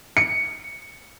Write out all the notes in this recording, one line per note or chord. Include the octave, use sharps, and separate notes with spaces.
C#7